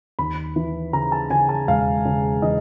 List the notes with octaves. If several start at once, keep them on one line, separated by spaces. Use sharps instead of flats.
D#2 B5
E3
C#3 A#5
A5
C#3 G#5
A5
E1 F5
C#3
E3 D#5